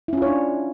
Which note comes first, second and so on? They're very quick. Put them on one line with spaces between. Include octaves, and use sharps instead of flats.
E4 C#4 F4 C#5 D4